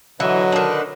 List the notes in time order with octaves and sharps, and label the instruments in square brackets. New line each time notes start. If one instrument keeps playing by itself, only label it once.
[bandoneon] D3 B4 D#5 [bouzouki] E3 [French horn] F#3
[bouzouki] D#3 D4